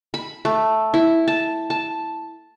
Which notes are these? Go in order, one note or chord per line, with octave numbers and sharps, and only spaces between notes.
B5
A3
E4
A5
A5